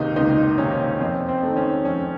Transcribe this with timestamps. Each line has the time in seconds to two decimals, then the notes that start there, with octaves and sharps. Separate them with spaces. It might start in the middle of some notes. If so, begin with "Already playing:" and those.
Already playing: C#2 C3 D#3 A#3 D#4
0.16 C#2 D#4
0.58 C3 D#3 A#3 C#4
1.00 F2 C4
1.29 C4
1.43 D#3 A3
1.57 C#4
1.85 F2 C#4